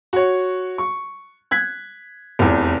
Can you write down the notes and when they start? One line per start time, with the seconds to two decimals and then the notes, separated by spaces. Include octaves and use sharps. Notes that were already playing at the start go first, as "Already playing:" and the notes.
0.13 F#4 C#5
0.78 C#6
1.51 F#6 G#6 B6
2.39 F1 E2